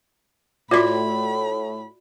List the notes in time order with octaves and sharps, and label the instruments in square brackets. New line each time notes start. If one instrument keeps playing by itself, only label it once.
[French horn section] A2 [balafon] F4 D6 [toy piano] F#4 D5 E5 [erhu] B5